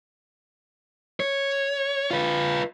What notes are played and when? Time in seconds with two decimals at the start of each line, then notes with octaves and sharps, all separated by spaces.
1.20 C#5
2.11 F4 B4